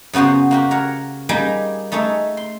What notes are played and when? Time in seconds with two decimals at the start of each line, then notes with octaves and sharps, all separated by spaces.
0.13 F#2 C#3 B3 F#4 C5
0.51 A#3 F#4 G4
0.71 A#4 C#5 F#5
1.29 G3 A#3 D#4 G4 G#4
1.92 A3 D#4 G#4 C#5 E5
2.37 C6